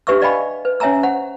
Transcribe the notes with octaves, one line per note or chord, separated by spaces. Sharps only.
D4 G4 B4 E5 C#6 E6
D5 D#5 F5 G5 G#5 B5
B4
C#4 C#5 E5 G#5 A#5 E6
C5 F#5